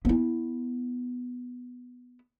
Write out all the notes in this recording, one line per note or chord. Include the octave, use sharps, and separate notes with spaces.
B3 E4